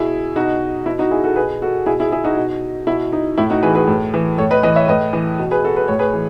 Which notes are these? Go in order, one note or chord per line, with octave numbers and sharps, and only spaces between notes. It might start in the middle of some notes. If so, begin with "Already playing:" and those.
Already playing: B2 E4 G#4
B2 D#4 F#4
B2 E4
D#4 F#4
E4 G#4
F#4 A4
B2 G#4 B4
F#4 A4
B2 E4 G#4
E4 G#4
E4 G#4
D#4 F#4
B2
B2 E4
D#4
A2 E4
D#4 F#4
E3 G#4 B4
G#4 B4
A2
E3
A2 A4 C#5
B4 D#5
E3 B4 D#5
C#5 E5
A2 B4 D#5
E3
B2
G#4 B4
F#4 A4
B4
A2 C#5
G#4 B4
E3